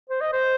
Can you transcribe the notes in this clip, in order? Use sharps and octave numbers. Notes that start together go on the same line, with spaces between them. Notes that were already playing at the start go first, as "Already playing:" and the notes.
C5
D#5
C5